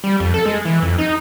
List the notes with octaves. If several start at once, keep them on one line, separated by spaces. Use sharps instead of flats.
G3
F2
A4
G#3
E3
F2
D#4